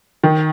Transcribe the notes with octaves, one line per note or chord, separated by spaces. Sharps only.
D#3